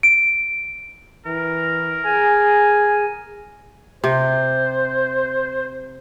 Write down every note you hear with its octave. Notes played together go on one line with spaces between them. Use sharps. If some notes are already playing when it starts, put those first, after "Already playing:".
D7
E3 A#4
G#4 G#5
C3 C5